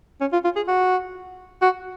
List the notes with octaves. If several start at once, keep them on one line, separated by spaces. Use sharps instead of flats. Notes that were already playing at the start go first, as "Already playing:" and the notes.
C#4
F4
F4
G#4
F#4
F#4